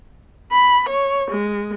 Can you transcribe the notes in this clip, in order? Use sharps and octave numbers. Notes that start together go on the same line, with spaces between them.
B5
C#5
G#3